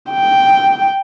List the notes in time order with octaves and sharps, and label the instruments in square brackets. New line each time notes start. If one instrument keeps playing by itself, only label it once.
[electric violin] G5